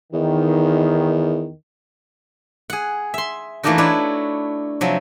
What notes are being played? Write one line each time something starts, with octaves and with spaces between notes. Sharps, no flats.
E2 D#3
G#4 F#5
E5 C6
E3 A3 A#3 D4 D#4 F#4
D4 E4 B4 C#5
C3 F3 F#3